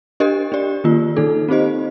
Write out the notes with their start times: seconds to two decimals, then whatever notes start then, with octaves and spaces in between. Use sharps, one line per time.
0.20 D4 G4 A#4 D#5
0.52 D4 G4 D5
0.84 D#3 A#3 F4
1.16 D#3 A#3 D#4 A4
1.48 C4 D#4 G4 C5 D#5